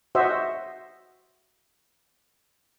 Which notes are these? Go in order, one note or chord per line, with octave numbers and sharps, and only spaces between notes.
F#4 C5 D#5 E5